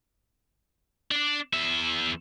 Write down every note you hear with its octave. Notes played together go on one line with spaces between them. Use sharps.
D4 D5
E2 E5